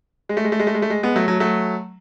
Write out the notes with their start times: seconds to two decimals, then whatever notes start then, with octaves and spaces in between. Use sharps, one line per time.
0.29 G#3
0.37 A3
0.44 G#3
0.52 A3
0.59 G#3
0.67 A3
0.74 G#3
0.82 A3
0.90 G#3
1.03 G#3 B3
1.16 F#3 A3
1.28 F#3 A3
1.40 F#3 A3